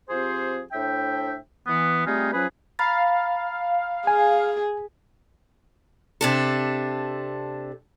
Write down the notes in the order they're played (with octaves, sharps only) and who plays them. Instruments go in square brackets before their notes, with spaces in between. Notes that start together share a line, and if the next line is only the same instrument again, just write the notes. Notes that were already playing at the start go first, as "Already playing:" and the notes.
[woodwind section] F3 C4 G4 G#4 C5
A2 D4 C5 E5 G5
E3 B3
G3 A3 C4 D#4 F4 G#4
F3 F#3 C#4 G#4 B4
[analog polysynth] F5 [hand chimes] A#5 B5 A6
[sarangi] G#4 [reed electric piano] G#5
[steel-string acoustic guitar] C3 D4 A4